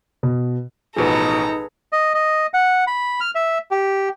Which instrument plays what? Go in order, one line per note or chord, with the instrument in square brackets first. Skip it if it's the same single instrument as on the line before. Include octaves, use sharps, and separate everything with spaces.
[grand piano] B2
[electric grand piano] A1 B2 F3 [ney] D#4 [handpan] G#4 B4 [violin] A4 A#5
[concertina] D#5
D#5
F#5
B5
F6
E5
G4